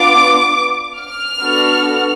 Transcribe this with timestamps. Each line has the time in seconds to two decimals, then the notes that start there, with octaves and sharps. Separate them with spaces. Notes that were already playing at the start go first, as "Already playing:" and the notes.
Already playing: B3 D4 F4 D6
0.99 F6
1.40 B3 D4 F#4 A4